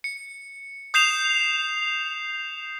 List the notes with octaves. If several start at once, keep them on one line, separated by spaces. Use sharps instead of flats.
C#7
D#6 G6 C7 E7 F7